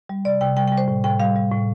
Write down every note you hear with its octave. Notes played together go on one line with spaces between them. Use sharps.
G3
C3 D5
C3 G5
G3 G5
G5
G3
C5
A2
A2 G5
G3 F5
G3
A2